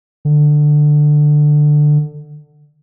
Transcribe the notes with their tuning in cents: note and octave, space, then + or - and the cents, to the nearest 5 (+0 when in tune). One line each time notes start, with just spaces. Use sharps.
D3 +15